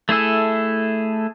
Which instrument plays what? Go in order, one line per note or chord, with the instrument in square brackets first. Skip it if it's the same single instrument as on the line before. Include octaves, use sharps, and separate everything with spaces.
[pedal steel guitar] A3 E4 G#4 A4